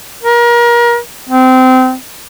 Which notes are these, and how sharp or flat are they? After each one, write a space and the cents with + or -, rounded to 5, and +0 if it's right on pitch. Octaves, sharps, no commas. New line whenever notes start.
A#4 +30
C4 -25